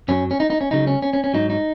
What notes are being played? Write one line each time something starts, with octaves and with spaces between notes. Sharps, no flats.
F#2 F#3 C#4
C#4
D#4
D#4
C#4
C#2 C#3 F#3 D#4
C#4
C#4
C#4
C#4
G#2 F#3 D#4
D#4